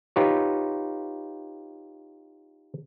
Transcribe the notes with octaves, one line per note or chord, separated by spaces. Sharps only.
D#4 F4 G4 B4 C#5